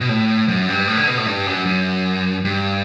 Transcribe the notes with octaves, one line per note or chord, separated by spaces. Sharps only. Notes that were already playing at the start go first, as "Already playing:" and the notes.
B2
A2
F#2
G2
A2
D3
B2
A2
G2
F#2
F#2
G2